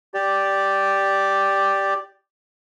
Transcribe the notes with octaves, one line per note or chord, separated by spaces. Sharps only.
G4 D5